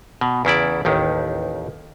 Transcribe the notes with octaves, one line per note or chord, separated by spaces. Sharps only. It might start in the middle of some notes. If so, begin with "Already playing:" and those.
B2
E2 C#3 E4 D5
A1 D#2 D#3